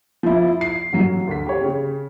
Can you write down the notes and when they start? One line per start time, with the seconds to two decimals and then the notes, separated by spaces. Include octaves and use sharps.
0.23 F3 E4
0.61 C7
0.93 A1 F#3
1.28 D2 B6
1.46 G4 C#5
1.61 C#3